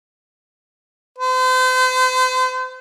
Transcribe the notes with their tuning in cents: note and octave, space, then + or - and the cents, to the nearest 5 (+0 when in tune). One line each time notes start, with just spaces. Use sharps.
C5 -40